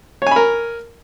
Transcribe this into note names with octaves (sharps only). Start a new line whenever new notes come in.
A#4 C#5 G#5 B5